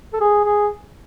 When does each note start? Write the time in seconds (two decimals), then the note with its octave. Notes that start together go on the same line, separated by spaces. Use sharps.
0.14 A4
0.21 G#4
0.45 G#4